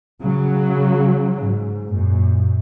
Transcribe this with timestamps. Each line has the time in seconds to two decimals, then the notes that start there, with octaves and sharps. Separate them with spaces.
0.23 C#3 F#3
1.35 G#2
1.91 F#2 A#2